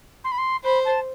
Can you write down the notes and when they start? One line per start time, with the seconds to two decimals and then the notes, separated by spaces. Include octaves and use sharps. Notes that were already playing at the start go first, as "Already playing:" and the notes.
0.24 C6
0.31 B5
0.38 C6
0.64 C5 B5
0.85 A5